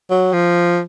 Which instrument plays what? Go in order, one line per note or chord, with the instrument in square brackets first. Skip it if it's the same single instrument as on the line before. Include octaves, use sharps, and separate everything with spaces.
[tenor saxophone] F#3
F3